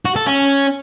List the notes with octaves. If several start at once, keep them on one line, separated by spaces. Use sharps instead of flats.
F#4
A4
C#4